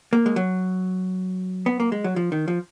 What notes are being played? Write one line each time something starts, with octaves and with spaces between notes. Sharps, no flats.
A#3
G#3
F#3
B3
A#3
G#3
F#3
F3
D#3
F3